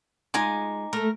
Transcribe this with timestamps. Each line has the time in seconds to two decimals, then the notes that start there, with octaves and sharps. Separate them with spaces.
0.34 G#3 D#4 F4 G#5 D6
0.93 A3 A4 A#4